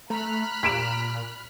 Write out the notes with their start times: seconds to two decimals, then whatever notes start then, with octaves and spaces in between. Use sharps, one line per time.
0.10 A3 A#5 B5 F6 F#6
0.63 A#2 B6 D7 E7